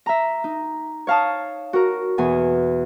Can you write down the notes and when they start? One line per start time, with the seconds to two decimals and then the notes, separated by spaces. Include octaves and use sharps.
0.06 E5 A#5
0.44 D#4
1.07 C#5 F5 A5 D#6
1.73 F#4 A#4
2.18 E2 B2 G#5